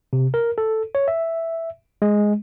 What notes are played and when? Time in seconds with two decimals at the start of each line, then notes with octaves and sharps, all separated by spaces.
0.13 C3
0.34 A#4
0.58 A4
0.95 C#5
1.08 E5
2.02 G#3